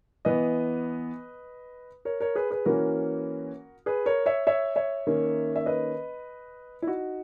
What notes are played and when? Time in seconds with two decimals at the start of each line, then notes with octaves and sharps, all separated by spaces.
0.25 E3 B3 B4 D#5
2.05 A#4 C#5
2.20 A#4 C#5
2.35 G#4 B4
2.51 G#4 B4
2.65 E3 A#3 C#4 F#4 A#4
3.86 G#4 B4
4.06 A#4 C#5
4.26 C#5 E5
4.47 C#5 E5
4.76 C#5 E5
5.07 D#3 A#3 C#4
5.56 E5
5.66 B4 D#5
6.82 E4
6.87 D#4 F#4